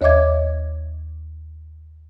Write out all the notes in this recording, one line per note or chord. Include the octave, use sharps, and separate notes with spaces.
D#2 C#5 D#5 E5 D6 G#6